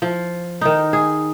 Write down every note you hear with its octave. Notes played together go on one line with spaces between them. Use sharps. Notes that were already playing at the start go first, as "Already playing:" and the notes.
F3
D#3 D#4
G#4